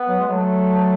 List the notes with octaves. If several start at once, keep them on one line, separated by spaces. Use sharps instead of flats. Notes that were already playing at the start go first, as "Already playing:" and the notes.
Already playing: B3
F#3
G#3
F#3 A3